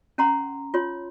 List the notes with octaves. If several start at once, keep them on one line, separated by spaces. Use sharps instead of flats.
C#4 F#5 A#5 C6
F4 C#5 C6